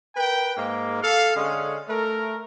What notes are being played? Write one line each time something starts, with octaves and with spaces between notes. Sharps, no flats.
A#4 B4 G5
G#2 A#3
A4 F5
D3 G#3 C#4
A3 A#4